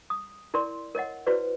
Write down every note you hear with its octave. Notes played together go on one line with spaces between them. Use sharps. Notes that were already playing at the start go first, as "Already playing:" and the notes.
D#6
E4 A#4 D5 C6
A#4 C#5 D#5 F#5
E4 F#4 B4 C5 D5